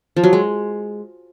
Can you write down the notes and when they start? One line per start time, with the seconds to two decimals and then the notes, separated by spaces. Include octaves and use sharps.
0.16 F3
0.24 F#3
0.33 G#3